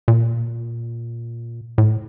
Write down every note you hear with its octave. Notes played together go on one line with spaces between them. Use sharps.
A#2
A2